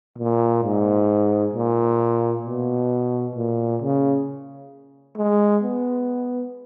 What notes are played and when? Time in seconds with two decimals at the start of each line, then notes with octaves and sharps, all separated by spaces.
0.18 A#2
0.64 G#2
1.54 A#2
2.45 B2
3.35 A#2
3.82 C#3
5.17 G#3
5.63 B3